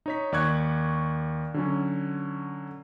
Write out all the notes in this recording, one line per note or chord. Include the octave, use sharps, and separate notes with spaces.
D#4 C#5 B6
D#2 D5 C#6 F#6 G#6
D3 F#3 C#4